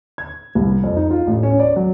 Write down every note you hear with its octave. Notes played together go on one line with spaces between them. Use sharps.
G#6
C2
F2
D#4
F4
A1
C#4
D5
F#3